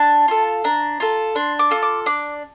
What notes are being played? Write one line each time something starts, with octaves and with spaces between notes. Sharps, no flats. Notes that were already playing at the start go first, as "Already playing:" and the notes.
Already playing: D4 A5
F4 A4
D4 A#5
F4 A4
D4 C6
D6
F4 A4
D6
D4 D6